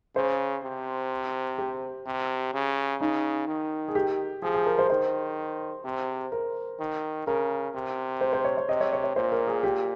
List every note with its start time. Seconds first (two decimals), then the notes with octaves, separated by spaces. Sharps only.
0.16 C#3 C5
0.64 C3
1.58 G4
2.06 C3
2.53 C#3
3.01 C#3 D#4
3.48 D#3
3.88 G#4
3.95 G4
4.42 F3 G#4
4.54 G#4
4.66 A#4
4.79 C5
4.90 D#3 C5
5.84 C3
6.32 A#4
6.80 D#3
7.26 C#3 A#4
7.74 C3
8.21 C5
8.33 C5
8.45 C#5
8.57 C#5
8.69 C3 D#5
8.81 C#5
8.93 C#5
9.04 C#5
9.16 A#2 C5
9.32 A#4
9.47 G#4
9.63 G4